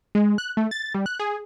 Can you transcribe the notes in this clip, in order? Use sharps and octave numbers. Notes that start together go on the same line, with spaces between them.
G#3
F#6
A3
A6
G3
F#6
G#4